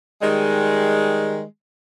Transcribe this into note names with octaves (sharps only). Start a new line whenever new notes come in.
D#3 G3 G#3